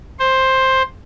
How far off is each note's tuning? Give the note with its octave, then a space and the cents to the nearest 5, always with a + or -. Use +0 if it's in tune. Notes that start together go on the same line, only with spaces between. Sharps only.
C5 +10